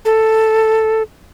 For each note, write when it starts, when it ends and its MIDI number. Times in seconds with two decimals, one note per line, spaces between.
0.05 1.03 69